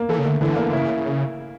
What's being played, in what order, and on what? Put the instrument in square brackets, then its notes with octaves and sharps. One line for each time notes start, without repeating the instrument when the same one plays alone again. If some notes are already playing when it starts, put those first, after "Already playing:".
Already playing: [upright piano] A#3
[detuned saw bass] E3 [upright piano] A4
[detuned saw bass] C#3
[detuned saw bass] D3 [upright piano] A3
[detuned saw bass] D3 [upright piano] E3
[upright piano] A#3
[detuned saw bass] C#3 [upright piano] E4